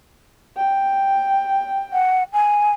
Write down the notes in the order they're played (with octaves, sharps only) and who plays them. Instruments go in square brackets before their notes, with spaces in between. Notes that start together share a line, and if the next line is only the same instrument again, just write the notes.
[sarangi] G5
[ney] F#5
G#5